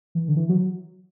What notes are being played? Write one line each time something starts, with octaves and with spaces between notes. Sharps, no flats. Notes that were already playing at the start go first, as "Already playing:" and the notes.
E3
D3
E3
F#3